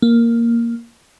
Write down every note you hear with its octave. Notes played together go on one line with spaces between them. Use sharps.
A#3